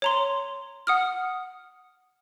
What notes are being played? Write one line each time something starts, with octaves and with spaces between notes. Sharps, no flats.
C#5 A#5 C6
F#5 D#6 F6